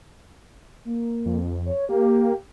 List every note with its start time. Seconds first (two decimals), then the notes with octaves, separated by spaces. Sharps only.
0.85 A#3
1.25 F2
1.66 C#5
1.89 A#3 G4